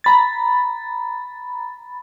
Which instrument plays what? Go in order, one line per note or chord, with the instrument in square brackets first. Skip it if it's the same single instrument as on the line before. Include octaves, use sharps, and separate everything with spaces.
[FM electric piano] A#5 B5 A6